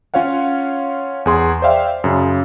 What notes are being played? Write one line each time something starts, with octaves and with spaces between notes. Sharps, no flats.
C#4 F4 C#5 F5 F#5
E2 G#4 C6
C5 D5 E5 F5 G5
F#2 C#3